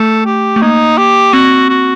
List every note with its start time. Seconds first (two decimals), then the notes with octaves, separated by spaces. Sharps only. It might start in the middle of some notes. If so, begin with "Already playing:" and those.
Already playing: A3 A4
0.26 G4
0.56 A3
0.62 A#3 D#4
0.98 G4
1.33 C4 F#4
1.69 F#4